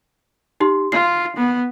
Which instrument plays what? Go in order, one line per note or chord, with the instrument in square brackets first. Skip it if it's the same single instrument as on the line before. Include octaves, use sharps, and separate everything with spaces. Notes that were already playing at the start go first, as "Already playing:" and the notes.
[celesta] D#4 G4 C6
[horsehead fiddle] F4 [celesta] C7
[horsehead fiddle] B3